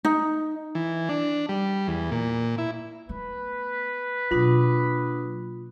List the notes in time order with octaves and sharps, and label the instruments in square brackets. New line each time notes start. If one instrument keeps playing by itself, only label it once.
[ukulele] D#4
[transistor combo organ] E3
D4
G3
E2
A#2
E4
[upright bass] A3 B3 [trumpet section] B4
[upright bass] B2 A#3 [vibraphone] F#3 D4 D#6 [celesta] F4